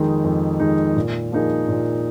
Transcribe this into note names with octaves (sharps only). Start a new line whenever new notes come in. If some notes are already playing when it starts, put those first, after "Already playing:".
Already playing: F2 D#3 G#3 D#4
F2
D#3 G#3 D#4
A#2
F3 A#3 D#4 G#4
A#2